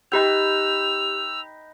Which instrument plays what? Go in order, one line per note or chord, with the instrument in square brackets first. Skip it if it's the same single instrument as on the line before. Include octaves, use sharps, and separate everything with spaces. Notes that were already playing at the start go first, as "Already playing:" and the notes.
[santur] D#4 B4 G5 [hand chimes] G4 G6 [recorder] E6 [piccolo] F7